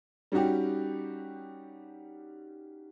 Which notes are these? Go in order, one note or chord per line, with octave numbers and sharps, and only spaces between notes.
G3 C#4 D#4 F#4 G4